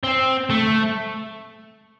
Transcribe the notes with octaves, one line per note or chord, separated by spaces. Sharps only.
C4
A3